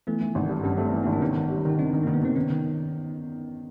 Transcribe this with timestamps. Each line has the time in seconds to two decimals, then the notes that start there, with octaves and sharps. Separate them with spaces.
0.07 E3 A3 B3
0.21 E3
0.35 G#1
0.49 G2
0.64 G2 C#4
0.77 A3 C4
0.90 E3 B3
1.03 A#3 C4
1.07 G#1
1.13 D4
1.22 D#3 B3 C#4
1.35 D#3
1.50 G3
1.65 D#3 D#4
1.79 D#3 C4 D4
1.93 D#3
2.03 D#3 A#3
2.14 B3
2.22 D#3 C4
2.36 D#3 B3 C#4
2.50 D#3